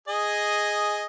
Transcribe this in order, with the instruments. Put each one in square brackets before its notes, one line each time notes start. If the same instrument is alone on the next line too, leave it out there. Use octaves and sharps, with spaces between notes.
[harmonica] G#4 D#5